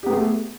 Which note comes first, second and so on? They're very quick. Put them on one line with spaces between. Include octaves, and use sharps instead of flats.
G4 B3 A3 G#4